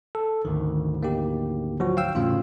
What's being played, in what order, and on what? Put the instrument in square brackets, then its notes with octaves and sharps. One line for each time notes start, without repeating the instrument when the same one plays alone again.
[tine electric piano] A4
[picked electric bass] G#1 D2 [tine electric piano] D#3
[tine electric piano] A#3 D#4 G4
F3 F#3 F#4
F5 G5 E6
[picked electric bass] E2 A2 C#3 [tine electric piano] F4 F5